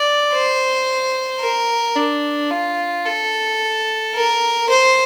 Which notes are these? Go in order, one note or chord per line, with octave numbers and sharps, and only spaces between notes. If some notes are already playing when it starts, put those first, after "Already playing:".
Already playing: D5
C5
A#4
D4
F4
A4
A#4
C5